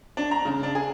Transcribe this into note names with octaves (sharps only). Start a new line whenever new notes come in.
D4
A#5
C#3
D4
G#4